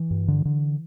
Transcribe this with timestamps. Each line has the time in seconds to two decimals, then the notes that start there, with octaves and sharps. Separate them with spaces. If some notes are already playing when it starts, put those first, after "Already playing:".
Already playing: E3
0.11 G2
0.28 D3
0.45 D3